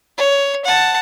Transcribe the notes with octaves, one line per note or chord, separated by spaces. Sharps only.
C#5
F#5 A5